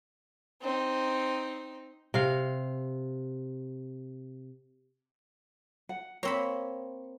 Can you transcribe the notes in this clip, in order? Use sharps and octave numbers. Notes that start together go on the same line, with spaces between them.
C4 D#4
C3 F5
F#5
A#3 C4 C#5 B5